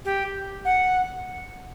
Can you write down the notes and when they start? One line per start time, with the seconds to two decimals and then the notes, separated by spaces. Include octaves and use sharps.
0.05 G4
0.65 F#5